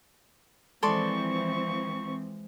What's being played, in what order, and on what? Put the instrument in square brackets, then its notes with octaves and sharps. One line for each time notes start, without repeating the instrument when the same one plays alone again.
[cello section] E3 F3 C4 [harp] G#3 [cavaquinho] A4 D5 C6 [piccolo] C#6